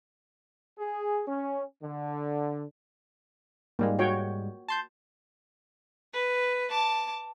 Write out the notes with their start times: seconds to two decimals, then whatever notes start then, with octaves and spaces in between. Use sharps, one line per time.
0.78 G#4
1.27 C#4
1.83 D3
3.79 G#2 G3 G#3 A#3
3.99 F#4 C#5 G5
4.68 A5 C6 G6
6.13 B4
6.71 A5 D6